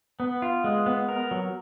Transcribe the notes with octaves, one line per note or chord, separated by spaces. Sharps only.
B3
F4
G#3
B3
A#4
F#3